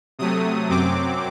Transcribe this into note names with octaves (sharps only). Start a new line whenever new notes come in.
C3 F#3 A3 D#6
F#2 F#3 C4 D6